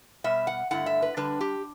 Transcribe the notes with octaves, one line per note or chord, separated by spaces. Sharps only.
B2 G3 B3 E5
F#5
G2 D3 A3 E4 F#5
E5
B4
D3 G3 D4 B4
G4